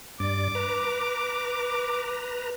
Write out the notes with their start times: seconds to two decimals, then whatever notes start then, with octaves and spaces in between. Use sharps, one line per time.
0.20 G2 D5 D6
0.55 B4 A#5